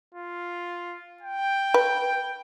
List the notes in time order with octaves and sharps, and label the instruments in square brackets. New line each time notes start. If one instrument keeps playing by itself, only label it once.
[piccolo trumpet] F4
G5
[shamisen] B4